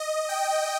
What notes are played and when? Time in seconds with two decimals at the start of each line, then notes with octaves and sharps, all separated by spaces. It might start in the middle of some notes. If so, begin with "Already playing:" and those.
Already playing: D#5
0.29 G5